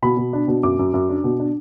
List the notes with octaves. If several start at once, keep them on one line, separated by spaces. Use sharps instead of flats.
B2 B5
B2
D4
B2
F#2 D6
F#2
F#2
D4
B2
D4